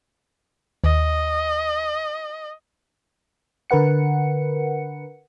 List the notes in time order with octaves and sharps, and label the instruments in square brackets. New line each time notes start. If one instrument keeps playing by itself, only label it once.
[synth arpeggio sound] D#2 [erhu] D#5
[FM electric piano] D3 A#4 B4 F#5 C#7